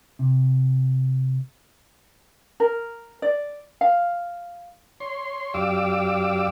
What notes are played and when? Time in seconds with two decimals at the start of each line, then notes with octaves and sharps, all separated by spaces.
0.19 C3
2.60 A#4
3.22 D5
3.81 F5
5.00 C#5 C6
5.54 F#2 G4 D5 F5 D6 E6